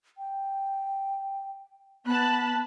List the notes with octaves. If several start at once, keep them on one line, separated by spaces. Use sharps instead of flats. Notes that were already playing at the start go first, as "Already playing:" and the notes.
G5
B3 A5 B5 F#6